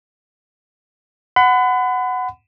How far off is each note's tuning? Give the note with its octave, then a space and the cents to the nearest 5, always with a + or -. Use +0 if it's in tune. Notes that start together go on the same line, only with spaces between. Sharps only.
F#5 +0 B5 +35